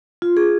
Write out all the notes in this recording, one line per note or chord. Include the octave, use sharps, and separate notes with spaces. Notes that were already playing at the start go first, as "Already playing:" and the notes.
F4
G#4